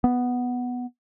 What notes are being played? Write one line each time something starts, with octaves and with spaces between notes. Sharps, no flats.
B3